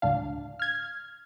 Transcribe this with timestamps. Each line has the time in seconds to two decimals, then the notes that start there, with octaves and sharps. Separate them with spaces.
0.02 D2 A2 D4 F5
0.59 F6 G#6